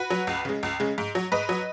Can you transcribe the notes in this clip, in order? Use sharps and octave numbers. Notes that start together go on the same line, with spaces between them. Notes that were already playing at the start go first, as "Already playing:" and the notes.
Already playing: F#4 B4
F#3
C#2
C#3 G#3
C#2
C#3 G#3
G#2
F#3
G#2 B4 D#5
F#3